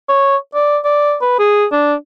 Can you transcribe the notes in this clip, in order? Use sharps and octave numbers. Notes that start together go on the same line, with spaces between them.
C#5
D5
D5
B4
G#4
D4